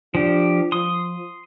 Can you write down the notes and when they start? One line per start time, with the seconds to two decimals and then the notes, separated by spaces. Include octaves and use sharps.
0.15 F3 D4 G4
0.72 F3 C6 D#6